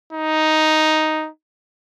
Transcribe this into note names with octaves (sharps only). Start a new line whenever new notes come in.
D#4